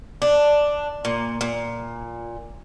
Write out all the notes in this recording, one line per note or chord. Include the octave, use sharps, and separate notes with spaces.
D4
A#2
A#2